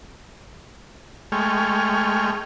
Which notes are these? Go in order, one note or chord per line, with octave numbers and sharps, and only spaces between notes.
G#3 A3 G5 G#5 C#6 F6